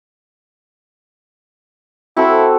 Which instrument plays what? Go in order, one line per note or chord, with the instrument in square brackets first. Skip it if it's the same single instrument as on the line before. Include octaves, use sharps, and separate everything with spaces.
[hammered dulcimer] C4 F#4 A4 [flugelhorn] E4